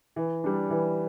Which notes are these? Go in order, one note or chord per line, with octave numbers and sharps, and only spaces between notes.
E3
G3 D4
E3